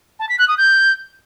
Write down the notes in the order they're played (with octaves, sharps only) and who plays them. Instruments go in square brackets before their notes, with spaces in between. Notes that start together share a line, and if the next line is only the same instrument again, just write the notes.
[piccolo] A5
B6
F#6
D#6
G6